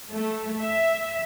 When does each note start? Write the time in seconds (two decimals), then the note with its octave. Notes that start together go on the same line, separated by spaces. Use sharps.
0.11 A3
0.61 E5